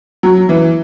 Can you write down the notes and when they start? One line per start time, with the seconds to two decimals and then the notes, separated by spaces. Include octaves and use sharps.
0.23 F#3
0.49 E3